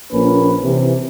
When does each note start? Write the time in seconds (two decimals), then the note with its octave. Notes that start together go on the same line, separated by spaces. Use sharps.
0.12 A#1 F3 A#3 C#4 B4
0.62 C3 E3